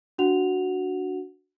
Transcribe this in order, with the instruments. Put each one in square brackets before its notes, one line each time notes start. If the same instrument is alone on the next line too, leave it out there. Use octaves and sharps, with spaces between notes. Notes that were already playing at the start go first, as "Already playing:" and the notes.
[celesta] D4 F#4 F#5 F7